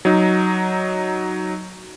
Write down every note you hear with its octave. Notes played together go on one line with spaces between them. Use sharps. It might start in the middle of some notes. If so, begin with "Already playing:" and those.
F#3 D#4